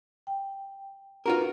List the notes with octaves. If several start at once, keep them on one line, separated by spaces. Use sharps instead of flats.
G5
D4 F4 F#4 A#4 B4